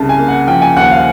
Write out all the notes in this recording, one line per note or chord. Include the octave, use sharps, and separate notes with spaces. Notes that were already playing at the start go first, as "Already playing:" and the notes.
Already playing: C2 C#3 A5
G#5
A#3
F#5
F3 G5
G#5
D#2 F#5
F5